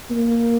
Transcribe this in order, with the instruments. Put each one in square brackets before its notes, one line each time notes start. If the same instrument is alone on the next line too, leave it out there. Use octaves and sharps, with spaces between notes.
[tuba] A#3